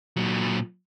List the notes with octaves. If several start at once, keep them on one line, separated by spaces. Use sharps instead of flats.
A#2 F#3